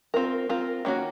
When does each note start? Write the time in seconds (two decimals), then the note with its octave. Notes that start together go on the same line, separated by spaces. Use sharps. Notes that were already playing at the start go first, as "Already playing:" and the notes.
0.14 C4 F4 A#4
0.49 C4 F4 A#4
0.85 D#3 A#3 C#4 F#4